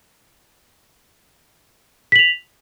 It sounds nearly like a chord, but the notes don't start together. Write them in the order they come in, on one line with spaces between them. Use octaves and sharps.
B6 F#7 F7